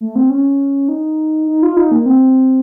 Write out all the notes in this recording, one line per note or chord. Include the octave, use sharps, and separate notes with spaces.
A3
C4
C#4
D#4
D#4
F4
D#4
A#3
C4